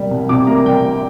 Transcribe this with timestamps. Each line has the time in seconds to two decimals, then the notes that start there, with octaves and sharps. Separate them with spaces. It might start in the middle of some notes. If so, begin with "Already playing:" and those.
Already playing: C3 G3 A#3
0.11 C2
0.29 C3 D6
0.47 A#3 A#5
0.66 G3 G5